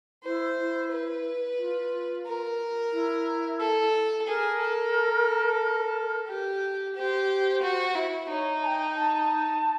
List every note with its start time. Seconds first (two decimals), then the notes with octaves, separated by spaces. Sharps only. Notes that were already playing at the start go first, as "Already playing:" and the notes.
0.24 E4 C5
0.58 E4
0.92 B4
1.58 F4
2.26 A#4
2.92 E4
3.60 A4
4.27 G#4 A#4
4.60 A4
6.27 G4
6.95 G4 C5
7.62 F#4
7.95 E4
8.29 D#4 C#5
8.63 A5
8.67 G5
8.96 A5